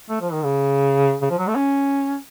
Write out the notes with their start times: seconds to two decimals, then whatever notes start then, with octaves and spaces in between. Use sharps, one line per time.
0.09 A3
0.21 F3
0.33 D#3
0.44 C#3
1.22 C#3
1.31 F3
1.39 F#3
1.47 A3
1.56 C#4